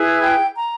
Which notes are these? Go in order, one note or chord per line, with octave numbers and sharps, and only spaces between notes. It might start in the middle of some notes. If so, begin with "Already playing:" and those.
Already playing: E4 G#4 B4
G5
A#5